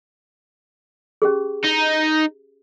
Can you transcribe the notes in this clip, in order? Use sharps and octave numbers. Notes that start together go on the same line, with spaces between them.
C#4 G4 G#4
D#4